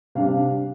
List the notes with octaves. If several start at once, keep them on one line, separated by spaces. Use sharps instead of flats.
C3 G3 D4 F5